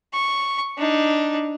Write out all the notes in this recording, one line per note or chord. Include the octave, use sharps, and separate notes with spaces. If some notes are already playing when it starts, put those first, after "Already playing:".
C#6
D4 D#4